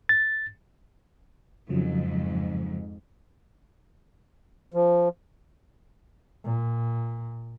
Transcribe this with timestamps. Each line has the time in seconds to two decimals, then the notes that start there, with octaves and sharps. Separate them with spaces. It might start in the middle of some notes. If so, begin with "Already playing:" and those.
0.09 A6
1.69 F2 G#2 C#3 F3 F#3
4.74 F3
6.44 A#2